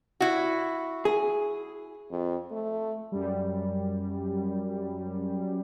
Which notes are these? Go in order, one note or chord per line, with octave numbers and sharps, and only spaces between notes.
E4 F#4
G#4
F2
A3
F#2 G3